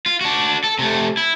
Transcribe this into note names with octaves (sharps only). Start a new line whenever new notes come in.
F4
D4 F#4
A4
C3 A3
E4